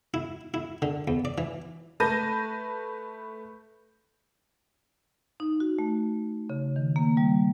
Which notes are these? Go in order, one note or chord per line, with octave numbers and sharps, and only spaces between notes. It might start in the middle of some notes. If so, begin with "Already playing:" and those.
E4
E4
D3
E2
D5
E3
A3 B4 A5 G6 A#6 D#7
D#4
F#4
A3
C#3
D#3
A#3
G3